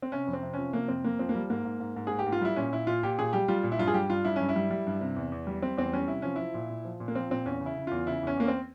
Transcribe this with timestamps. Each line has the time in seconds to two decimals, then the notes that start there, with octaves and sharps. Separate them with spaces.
0.02 C4
0.12 C3 C#4
0.27 F2
0.33 C4
0.43 C3
0.53 F3 C#4
0.73 C3 A#3
0.88 F2 C4
1.04 F2 A#3
1.19 F3 C4
1.29 A#3
1.35 G3
1.50 G#2 A#3
1.65 G#2
1.80 G#2
1.96 G#2
2.07 G#2 G#4
2.19 G4
2.26 G#2
2.32 F4
2.41 G3 E4
2.56 A#2 C#4
2.72 A#2 E4
2.87 A#2 F4
3.03 A#2 G4
3.19 A#2 G#4
3.33 G3 G4
3.48 G3 F4
3.63 A#2
3.72 E4
3.79 G2 F4
3.87 G#4
3.94 G3 G4
4.10 G2 F4
4.24 G2 E4
4.36 G2 C#4
4.49 E4
4.56 G3
4.70 G3
4.87 G2
5.01 C3
5.16 E2
5.32 E2
5.47 G3
5.62 G3 C4
5.77 E2 C4
5.93 G3 C#4
6.08 C3 E4
6.22 F3 C#4
6.36 F3 E4
6.54 A#2
6.70 A#2
6.85 F3
7.00 A#2
7.08 A#3
7.15 F3 C4
7.30 A#2 C4
7.46 E2 C#4
7.61 C#3
7.66 E4
7.77 C#3
7.87 E2 F4
8.07 C#3 E4
8.23 E2 C#4
8.37 E2 A#3
8.48 C4